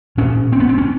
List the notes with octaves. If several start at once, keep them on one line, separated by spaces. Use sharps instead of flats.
A#2 C#4
C4
B3
C4
C#4